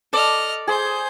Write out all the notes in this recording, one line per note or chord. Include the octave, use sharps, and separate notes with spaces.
A4 D5 D#5 F6
G#4 C5 G6